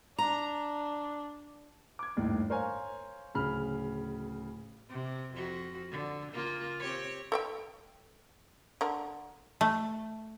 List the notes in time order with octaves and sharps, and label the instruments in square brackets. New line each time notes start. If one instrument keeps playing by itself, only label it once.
[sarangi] D4 [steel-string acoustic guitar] A#5
[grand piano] D6 G#6
G1 D#2 A2
A#4 C5 C#5 F5 G#5
D1 C#3 B5 F6
[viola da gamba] C3
F2 F#4
D3
C#3 A#3 F4
C4 G4 C#5
[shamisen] A4 E5 G5
D3 A#4
[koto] A3